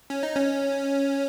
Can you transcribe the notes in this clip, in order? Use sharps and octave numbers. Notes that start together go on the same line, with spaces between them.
C#4
D#4
C#4